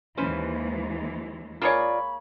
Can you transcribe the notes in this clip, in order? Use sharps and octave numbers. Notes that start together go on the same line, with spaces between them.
D#2 E3 G#3 C#4 B4 C5
A#3 F4 G#4 C#5 D5 B5